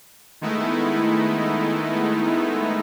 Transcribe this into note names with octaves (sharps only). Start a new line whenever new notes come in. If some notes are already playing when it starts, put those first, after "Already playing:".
D#3 G#3 A3 B3 D#4 E4